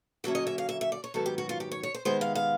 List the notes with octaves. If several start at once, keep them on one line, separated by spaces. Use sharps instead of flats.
D3 F#3 A#3 C#4 E5
D#5
E5
F5
E5
E5
D5
C#5
G#2 D#3 F#3 B3 A4
G4
F#4
F4
G4
C#5
C#5
C5
C3 D#3 G#3 B3 C5
F5
F5